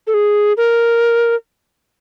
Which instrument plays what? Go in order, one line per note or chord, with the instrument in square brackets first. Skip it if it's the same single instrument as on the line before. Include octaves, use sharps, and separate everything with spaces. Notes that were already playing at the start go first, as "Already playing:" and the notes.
[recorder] A4
G#4
A#4